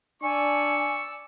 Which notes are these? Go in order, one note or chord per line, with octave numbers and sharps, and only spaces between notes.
D4 D5 G#5 C#6 E6